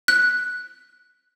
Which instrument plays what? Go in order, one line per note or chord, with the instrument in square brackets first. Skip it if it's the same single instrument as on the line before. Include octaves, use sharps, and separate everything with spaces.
[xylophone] F#6